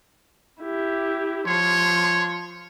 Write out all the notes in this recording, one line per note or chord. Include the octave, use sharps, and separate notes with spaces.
E4 G4
F3 C#5 C6